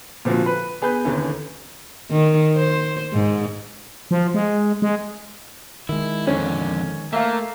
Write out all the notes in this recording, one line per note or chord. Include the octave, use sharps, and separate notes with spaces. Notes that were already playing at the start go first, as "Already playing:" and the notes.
A#2 D3 F3 C4 F4 F#4
B4
B3 G#4 B4 G6
D#2 D3 E3 C#4
D#3
C5
G#2
F3
G#3
G#3
D#3 G#3 E4
F2 D3 C#4
A3 A#3 E5 F5